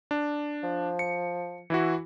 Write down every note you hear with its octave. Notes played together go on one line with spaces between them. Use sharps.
D4
F3
C#7
E3 E4 F#4